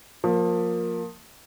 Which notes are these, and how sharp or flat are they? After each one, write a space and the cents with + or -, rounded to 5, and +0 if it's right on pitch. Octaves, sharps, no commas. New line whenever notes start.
F3 +25 A#3 +0